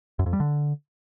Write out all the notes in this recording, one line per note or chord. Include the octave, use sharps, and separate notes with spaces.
F#2
F2
G3
D3